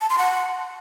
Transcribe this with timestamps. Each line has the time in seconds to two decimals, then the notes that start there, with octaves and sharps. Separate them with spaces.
0.01 A5
0.10 C6
0.18 F#5